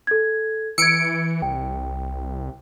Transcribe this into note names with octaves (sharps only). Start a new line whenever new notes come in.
A4 G#6
E3 E6 G#6 C#7 D7
C2 G5